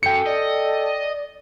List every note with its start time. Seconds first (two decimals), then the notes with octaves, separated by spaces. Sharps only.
0.03 F#2 A4 G5 C#7
0.26 D5 D#5